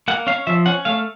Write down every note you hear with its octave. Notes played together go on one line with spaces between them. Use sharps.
A#3 F#5
C#4 F5
F3 E5
C#4 F#5
A3 F5